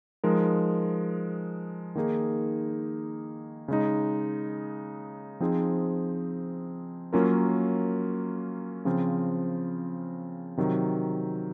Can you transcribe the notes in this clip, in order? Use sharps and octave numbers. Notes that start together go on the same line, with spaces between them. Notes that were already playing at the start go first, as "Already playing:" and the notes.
F3 G#3 D#4 A#4
D#3 A#3 D#4 G#4
C#3 G#3 D#4
F3 C4 D#4 G#4
F#3 A#3 C#4 F4 A#4
C#3 F3 C4 F4
C3 D#3 F#3